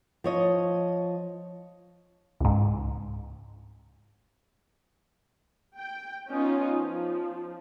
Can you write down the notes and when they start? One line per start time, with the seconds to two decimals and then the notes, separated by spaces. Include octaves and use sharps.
0.24 F3 C#5 D#5
2.40 C#2 G#2
5.77 G5
6.28 B3 C#4 D#4 F4
6.77 F3